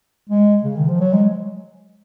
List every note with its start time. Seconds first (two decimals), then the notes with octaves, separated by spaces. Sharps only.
0.30 G#3
0.63 C#3
0.77 D#3
0.88 F3
1.01 F#3
1.13 G#3